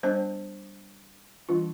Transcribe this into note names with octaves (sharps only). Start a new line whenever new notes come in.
G3 B3 D4 C5
E3 G3 B3 D4 F4